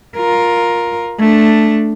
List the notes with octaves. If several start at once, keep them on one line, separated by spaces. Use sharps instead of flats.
F4 A#4
A3 D4